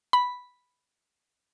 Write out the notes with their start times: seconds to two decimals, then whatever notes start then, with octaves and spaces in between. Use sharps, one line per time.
0.13 B5